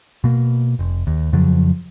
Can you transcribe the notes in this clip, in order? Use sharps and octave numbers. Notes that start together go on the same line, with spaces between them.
B2 A#3
F1
D#2
F2 C#3 F3 F#3